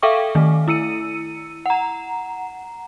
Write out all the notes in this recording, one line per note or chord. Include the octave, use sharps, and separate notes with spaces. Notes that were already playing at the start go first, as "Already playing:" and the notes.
A4 E5 F5 G5 C#6 D6
D#3 A3
E4 E6 C#7 D#7
F#5 A#5